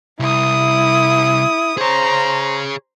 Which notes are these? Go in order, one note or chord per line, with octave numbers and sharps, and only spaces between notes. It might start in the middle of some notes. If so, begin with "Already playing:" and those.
C2 E4 D#6
G#4 C5 C#5 A#5